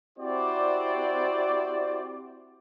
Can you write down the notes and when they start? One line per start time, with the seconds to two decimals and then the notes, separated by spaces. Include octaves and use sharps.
0.19 C4 E4 F#4 G4 C5 D5